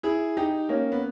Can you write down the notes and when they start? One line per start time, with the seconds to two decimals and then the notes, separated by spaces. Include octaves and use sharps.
0.03 E4 G#4
0.37 D#4 G4
0.69 A#3 C#4
0.92 B3